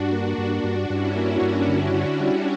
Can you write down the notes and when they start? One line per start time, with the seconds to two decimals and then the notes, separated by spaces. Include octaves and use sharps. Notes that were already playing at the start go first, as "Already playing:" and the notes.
Already playing: G2 D4 F#4
0.12 A#3
0.38 G2
0.64 G2
0.90 G2 C#4 E4
1.16 A#3
1.41 G2
1.68 D3
1.94 D3
2.20 G3